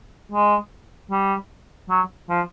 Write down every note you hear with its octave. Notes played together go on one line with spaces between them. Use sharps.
G#3
G3
F#3
F3